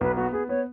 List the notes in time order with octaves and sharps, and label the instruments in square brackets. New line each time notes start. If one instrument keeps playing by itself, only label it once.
[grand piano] B1 [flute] B4
[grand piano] B3 [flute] F#4
[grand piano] B3 [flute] G#4
[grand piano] B3 [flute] C#5